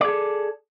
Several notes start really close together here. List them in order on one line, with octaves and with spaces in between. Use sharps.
D5 G#4 A4